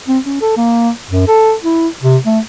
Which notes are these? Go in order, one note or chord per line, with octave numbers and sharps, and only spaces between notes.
C4
C#4
A4
A#3
F#2
A4
E4
C3
A3